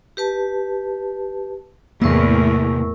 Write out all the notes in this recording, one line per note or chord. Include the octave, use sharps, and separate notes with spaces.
G4 B4 A5
E2 A2 C3 A#3 A#4 C#6 E6